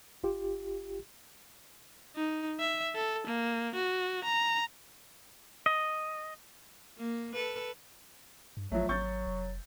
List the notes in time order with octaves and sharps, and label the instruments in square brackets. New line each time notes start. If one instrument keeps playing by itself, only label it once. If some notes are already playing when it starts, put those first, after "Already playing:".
[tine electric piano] G1 F4 G4
[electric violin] D#4
E5
A4
A#3
F#4
A#5
[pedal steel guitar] D#5
[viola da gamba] A#3
A4 B4
[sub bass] G2
[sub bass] A1 [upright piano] F3 A3 [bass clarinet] F#3
[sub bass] G#1 [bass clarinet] F#3 [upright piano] C#6 G6 A6
[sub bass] F1